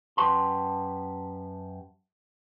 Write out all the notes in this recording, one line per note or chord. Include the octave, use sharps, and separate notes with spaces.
F#2 C3 G4 B4 A5 C6